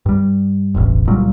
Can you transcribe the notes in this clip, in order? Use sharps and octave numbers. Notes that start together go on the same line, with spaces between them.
G2 G3
E1 A1
C#2 A#2 F#3 G3